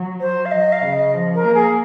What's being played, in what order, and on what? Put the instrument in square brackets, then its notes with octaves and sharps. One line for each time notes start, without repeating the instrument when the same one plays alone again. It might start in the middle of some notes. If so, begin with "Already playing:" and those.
Already playing: [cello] F#3
[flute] C5
F5
[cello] F#3 [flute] D#5
[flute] F5
[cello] C#3
[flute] D#5
[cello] F3
[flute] A#4
[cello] A#3
[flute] G#4